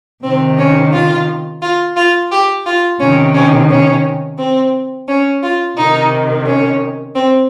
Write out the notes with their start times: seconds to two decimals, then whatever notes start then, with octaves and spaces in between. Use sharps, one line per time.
0.23 C3 D#3 C4
0.58 C#4
0.93 F4
1.62 F4
1.97 F4
2.31 G4
2.66 F4
3.00 C3 D#3 C#4
3.35 C#4
3.70 C#4
4.38 C4
5.08 C#4
5.43 F4
5.77 C3 D#3 D#4
6.46 C#4
7.16 C4